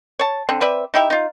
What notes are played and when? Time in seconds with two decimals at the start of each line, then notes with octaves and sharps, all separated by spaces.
0.19 C#5 A5
0.49 D3 C4
0.61 C4 B4 D5 E5
0.94 D#4 E4 G4 E5
1.10 D#4 F4